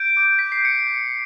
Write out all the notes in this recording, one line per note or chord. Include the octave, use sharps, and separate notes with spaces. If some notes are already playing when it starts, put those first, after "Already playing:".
Already playing: G6 D7
D6
G6 B6
C7
G6 C#7
G6